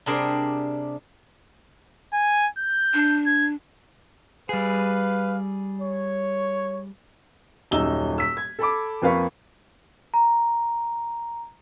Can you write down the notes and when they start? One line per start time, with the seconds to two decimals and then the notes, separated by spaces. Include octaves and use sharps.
0.06 C3 G3 D4 G#4 A#4 C5
2.14 G#5
2.58 G6
2.94 D4
3.26 G#6
4.49 G3 G#4 B4 F5
5.80 C#5
7.71 D#1 F#2 D#4 E6 G7
8.18 E6 B6
8.37 G#6
8.59 A4 A5 B5 D6
9.02 F2 A#3 B4 F5 B5 C#6
10.14 A#5